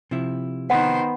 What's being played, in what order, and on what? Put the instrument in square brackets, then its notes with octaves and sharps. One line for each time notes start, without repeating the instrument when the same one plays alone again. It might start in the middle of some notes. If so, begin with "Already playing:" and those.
[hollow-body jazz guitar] C3 F3 E4
[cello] D#3 C5 [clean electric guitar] B3 [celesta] F#5